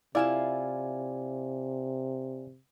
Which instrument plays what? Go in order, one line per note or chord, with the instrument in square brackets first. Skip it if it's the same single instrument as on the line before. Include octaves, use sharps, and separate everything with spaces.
[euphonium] C3 [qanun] E4 F4 A5 [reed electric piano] D5 F5 G#5